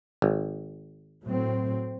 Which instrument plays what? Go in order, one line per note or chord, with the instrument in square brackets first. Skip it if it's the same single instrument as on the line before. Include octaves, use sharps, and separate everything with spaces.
[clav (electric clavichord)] G#1
[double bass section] A2 F#3 C4